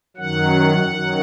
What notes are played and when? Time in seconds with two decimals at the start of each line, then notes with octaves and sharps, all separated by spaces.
0.17 F#2 D#3 F#3 F#5
0.87 F#2 D#3 F#3